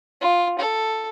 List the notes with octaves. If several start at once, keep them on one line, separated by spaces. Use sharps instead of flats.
F4
A4